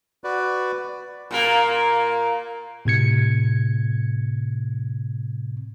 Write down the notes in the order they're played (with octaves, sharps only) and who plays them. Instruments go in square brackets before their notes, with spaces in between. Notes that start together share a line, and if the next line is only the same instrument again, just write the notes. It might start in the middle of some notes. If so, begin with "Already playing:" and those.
[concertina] F#4 B4 D5
[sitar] A#2 A#3 A#4
[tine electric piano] A2 C3 G#6 C#7